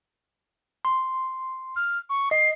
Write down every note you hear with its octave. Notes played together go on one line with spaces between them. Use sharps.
C6
F6
C#6
D#5 C7